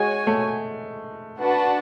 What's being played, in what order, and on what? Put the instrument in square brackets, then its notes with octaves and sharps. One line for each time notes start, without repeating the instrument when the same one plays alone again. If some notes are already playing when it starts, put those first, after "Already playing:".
Already playing: [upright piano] G#3 [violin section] F#4 C#5 G#5
[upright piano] A3
[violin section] D4 F#4 B4 F#5 A5